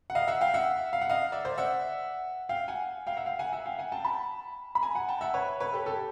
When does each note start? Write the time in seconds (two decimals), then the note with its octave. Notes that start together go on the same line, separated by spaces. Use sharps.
0.10 F#5
0.15 D#5 F5
0.28 E5 F#5
0.41 F5 G5
0.54 E5 F#5
0.93 F5
1.01 F#5
1.10 D#5 F5
1.32 D5 E5
1.45 C5 D5
1.58 E5 F#5
2.49 F5 G5
2.68 F#5 G#5
3.07 F5 G5
3.17 E5 F#5
3.26 F5 G5
3.39 F#5 G#5
3.52 E5 F#5
3.66 F5 G5
3.78 F#5 G#5
3.92 G5 A5
4.04 A5 B5
4.75 B5
4.82 G#5 A#5
4.95 F#5 G#5
5.09 G5 A5
5.21 E5 F#5
5.34 B4 C#5
5.60 B4 C#5
5.73 G4 A4
5.86 G4 A4